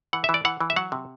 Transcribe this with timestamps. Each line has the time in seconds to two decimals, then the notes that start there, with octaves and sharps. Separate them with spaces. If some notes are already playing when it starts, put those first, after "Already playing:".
0.13 E3 F#5
0.24 E5
0.29 E3
0.34 D5
0.45 E3 F#5
0.60 E3
0.70 E5
0.76 F#3 F#5
0.92 C3